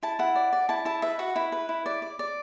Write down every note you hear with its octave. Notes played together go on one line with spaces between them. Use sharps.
E4 A5
E4 F#5
D5
D5
E4 A5
E4 A5
B4 E5
F#4 F#5
E4 B5
B4
E4
D5
D5
D5